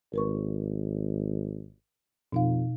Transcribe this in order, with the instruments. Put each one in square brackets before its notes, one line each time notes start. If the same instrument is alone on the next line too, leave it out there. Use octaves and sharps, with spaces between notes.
[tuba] G#1 [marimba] A#4 B4 C#6
[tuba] F2 [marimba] B2 D#4 F5